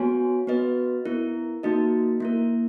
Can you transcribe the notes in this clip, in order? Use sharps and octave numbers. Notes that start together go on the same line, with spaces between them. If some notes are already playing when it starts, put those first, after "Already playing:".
Already playing: B3 F#4 C#5 G#5
B3 F#4 B4 D#5
B3 E4 A#4
A#3 D#4 F#4 A#4 D#5
A#3 E4 A#4